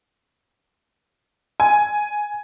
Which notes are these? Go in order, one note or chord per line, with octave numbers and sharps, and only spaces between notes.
G#5